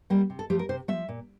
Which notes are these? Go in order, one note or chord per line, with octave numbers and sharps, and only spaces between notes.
G3 A#3
C3
A4
F3 A3 G4
A#4
C3 C5
F3 A3 E5
A#2